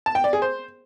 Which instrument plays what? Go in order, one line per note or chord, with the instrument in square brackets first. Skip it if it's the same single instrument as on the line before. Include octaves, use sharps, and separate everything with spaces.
[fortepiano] A5
G5
D5
G#4
C5